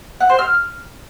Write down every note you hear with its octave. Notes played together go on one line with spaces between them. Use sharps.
F#5
C5
F6